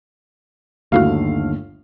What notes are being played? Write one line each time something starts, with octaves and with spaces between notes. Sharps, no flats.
G1 D#2 D3 A3 A#3 E4 F#4 F5